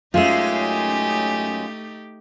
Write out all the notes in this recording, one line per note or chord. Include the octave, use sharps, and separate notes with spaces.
F#2 G#3 A3 D#4 F4 G4 E5